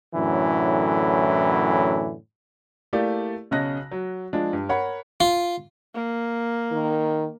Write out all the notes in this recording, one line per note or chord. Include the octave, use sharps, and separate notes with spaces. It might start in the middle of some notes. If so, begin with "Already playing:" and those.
F#2 A2 D3 E3
A3 A#3 E4 G4 D5
B1 C#3 C#4 D#5 F#6 A#6
F#3
F3 G#3 D4
G2
A#4 C#5 F#5 B5
F4
A#3
D#3